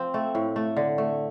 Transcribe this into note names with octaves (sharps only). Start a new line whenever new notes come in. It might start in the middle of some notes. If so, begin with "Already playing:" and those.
Already playing: F3 C4
A3
A2
A3
D3
A3